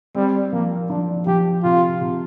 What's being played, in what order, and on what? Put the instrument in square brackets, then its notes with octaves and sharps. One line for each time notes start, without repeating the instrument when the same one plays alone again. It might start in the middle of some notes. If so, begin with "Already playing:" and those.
[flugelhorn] G3 [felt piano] C4
[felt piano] F3 [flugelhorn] A#3
[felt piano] F3 [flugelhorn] D4
[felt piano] F3 [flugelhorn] G4
[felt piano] C3 [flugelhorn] F4
[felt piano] C3